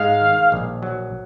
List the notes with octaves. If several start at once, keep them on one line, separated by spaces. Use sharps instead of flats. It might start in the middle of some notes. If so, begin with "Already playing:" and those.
Already playing: G#2 G#3 F5
D#3
A#1
F#3